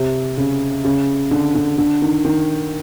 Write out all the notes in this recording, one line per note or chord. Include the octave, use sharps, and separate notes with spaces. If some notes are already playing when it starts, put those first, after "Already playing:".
Already playing: C3
C#3
C#3
D3
D3
D3
D#3
D#3